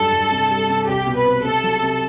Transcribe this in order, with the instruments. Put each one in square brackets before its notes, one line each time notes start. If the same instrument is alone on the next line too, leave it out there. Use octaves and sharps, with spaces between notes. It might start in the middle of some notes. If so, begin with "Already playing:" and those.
Already playing: [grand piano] G2 F#3 [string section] A4
[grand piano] G2
C3
G3
C3
[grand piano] C2 [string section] G4
[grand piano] B2
[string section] B4
[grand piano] C4
[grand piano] C3 [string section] A4
[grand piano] F#3
C3